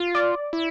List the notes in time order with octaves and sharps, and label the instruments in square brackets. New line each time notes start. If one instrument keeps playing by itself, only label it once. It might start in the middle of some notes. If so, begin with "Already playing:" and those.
Already playing: [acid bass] F4
[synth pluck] D5
[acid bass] E4